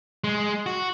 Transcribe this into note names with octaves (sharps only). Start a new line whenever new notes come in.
G#3
F#4